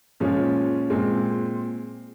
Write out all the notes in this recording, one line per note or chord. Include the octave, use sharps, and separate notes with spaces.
A#2 F3 G#3 C#4
A#2 G#3 C4